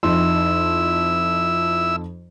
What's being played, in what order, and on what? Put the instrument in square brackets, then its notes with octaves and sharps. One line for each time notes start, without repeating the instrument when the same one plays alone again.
[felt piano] F2 D#4 C6 [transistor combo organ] E4 E6